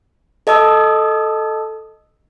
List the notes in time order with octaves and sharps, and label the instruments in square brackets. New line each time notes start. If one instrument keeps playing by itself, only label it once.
[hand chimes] A4 D#5 A5 D#6 E6